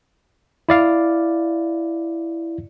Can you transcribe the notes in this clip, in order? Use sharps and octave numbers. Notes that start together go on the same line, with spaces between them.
E4 D5 F5